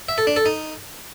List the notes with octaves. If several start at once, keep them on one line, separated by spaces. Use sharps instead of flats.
E5
A4
D4
A4
D#4